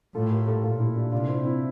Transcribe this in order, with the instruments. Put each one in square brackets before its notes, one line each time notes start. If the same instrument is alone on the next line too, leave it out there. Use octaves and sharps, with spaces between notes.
[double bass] A2 [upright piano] F4 A4
[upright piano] G4 A#4
F4 A4
[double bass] A#2 [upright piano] F4 A4
[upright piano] E4 G4
D4 F4
[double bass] C3 [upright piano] D4 F4
[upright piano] C4 E4
C4 E4